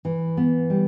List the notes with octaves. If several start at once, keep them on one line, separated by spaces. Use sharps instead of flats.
E3
B3
G3